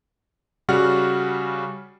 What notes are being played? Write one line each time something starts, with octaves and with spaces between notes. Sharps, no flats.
C#3 G3 F#4 F#5 F6